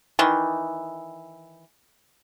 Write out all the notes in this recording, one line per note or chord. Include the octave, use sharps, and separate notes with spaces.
D#3 E3